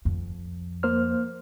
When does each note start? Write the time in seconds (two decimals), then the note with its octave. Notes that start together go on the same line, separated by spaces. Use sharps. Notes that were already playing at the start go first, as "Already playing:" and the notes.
0.05 F2
0.83 A#3 C5 F6